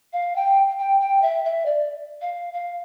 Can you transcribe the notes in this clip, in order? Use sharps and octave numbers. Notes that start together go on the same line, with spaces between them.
F5
G5
G5
G5
E5
E5
D5
F5
F5